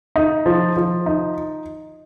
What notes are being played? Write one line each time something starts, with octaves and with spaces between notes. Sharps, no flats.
D#4
F3
F3
D#4